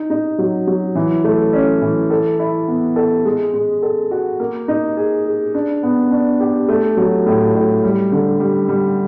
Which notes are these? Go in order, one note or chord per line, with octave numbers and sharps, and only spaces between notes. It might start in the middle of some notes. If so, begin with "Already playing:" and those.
Already playing: D#4
D#4
F#3
F#3
E3
A3
C#4
E3
A4
E4
B3
A4
G#3
G#3
A4
F#4
A#3
D#4
G#4
G#4
D4
B3
D4
G4
A3
F#3
A2
A2
G3
D3
G3
G3